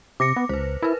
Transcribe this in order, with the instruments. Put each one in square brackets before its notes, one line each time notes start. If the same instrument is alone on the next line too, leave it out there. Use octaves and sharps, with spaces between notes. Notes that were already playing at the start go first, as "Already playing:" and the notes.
[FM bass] C3 [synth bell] D6 A#6 C#7
[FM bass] B3
[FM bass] C#2 [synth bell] B4 C5
[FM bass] E4 [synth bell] A#4 B4